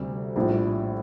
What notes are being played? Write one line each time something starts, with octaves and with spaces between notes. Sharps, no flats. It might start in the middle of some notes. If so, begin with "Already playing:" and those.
Already playing: D2 C3 G3
A#1 A2 G3 D4 F4